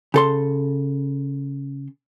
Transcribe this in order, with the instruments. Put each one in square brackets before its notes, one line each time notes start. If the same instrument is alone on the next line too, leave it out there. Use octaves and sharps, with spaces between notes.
[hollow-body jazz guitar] C#3 A4 C6